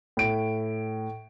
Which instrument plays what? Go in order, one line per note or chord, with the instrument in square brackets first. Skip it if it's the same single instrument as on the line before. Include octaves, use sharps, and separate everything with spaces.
[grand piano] A2 D7